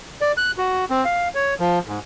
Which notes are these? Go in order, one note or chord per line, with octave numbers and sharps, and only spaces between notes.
D5
F#6
F#4
C4
F5
C#5
F3
G#2